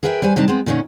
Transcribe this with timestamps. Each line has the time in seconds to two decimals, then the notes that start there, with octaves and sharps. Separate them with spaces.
0.03 G#4 A#4 B4 E5 F#5 G5
0.22 G3 B4 C5 G#5
0.36 C3 G3 D4 D#4 A5
0.48 G#3 B3 C4
0.66 A#2 D3 D#3 C#4 D#4